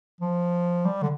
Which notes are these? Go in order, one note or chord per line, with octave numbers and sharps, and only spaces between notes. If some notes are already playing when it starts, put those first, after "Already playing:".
F3
G3
D3